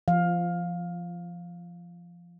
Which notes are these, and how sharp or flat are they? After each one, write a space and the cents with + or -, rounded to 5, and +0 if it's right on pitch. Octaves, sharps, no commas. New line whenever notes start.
F3 -20 F5 +15